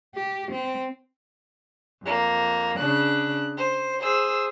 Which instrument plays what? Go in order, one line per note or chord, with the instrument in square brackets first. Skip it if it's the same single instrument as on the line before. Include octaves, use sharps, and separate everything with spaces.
[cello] G4
C4
[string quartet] F2 A#3
C#3 D4 F#6
C5
G#4 C5 E6